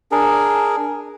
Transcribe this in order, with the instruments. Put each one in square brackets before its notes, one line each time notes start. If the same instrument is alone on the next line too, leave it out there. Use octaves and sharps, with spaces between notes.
[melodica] D4 G#4 A#4